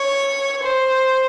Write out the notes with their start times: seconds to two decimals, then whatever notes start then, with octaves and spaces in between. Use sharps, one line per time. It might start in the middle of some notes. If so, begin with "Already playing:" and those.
Already playing: C#5
0.64 C5